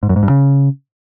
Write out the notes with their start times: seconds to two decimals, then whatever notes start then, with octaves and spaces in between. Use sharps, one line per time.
0.03 G#2
0.09 F#2
0.16 G#2
0.23 G2
0.29 C#3